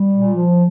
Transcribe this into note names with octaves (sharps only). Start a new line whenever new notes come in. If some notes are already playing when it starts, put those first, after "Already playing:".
Already playing: G3
A#2
F3